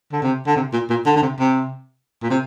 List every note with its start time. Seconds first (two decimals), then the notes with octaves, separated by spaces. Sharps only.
0.12 D3
0.23 C3
0.47 D3
0.56 C3
0.73 A#2
0.90 A#2
1.06 D3
1.16 D3
1.22 C3
1.39 C3
2.23 A#2
2.30 C3